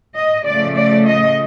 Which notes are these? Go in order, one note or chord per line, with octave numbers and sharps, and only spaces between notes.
D#5
C#3 F3 A3 D5
D5
D#5